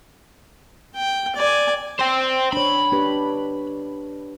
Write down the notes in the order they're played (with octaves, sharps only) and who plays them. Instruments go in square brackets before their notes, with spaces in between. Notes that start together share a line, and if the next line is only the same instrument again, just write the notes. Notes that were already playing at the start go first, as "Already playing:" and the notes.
[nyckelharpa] G5
D5 G#5
[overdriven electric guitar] C5 G5
[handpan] D4 C#5 [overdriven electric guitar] B5
[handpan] D4 G4 B4